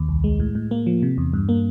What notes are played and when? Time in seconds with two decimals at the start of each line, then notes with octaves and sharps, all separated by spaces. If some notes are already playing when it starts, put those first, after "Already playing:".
Already playing: D#2
0.09 C2
0.24 G#3
0.40 A2
0.55 A2
0.71 A#3
0.87 F3
1.03 C3
1.18 E2
1.33 G2
1.49 A#3